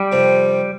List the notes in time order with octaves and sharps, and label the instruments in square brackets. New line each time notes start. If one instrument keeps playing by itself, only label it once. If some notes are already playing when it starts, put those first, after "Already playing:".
Already playing: [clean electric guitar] G3
[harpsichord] F2 C3 F3 C4